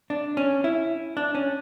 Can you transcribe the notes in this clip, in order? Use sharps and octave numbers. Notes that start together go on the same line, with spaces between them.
D4
C#4
E4
D4
C#4